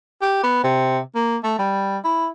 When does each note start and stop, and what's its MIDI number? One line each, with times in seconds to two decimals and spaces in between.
0.22 0.39 67
0.43 0.62 59
0.64 1.00 48
1.15 1.37 58
1.44 1.58 57
1.59 1.98 55
2.04 2.28 64